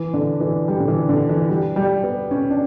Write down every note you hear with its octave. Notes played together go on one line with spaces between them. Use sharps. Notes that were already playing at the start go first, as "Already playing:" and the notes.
Already playing: E3
D3
E3
G3
D3
E3
D3
E3
G3
G3
B3
C#4
D4